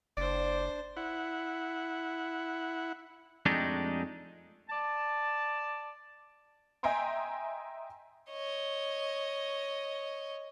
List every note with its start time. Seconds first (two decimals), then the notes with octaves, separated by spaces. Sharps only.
0.17 F#1 D4 C5 D5
0.97 E4 F#5
3.46 F2 G#3 A3 D4 D#4 G4
4.70 D5 A5
6.83 D#5 E5 G5 G#5 A#5 C6
8.31 C#5 D#5